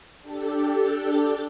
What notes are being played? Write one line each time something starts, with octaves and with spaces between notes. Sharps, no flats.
D4 G4 A4